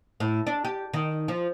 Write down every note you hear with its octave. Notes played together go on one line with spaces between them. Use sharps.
A2
D4
G4
D#3
F3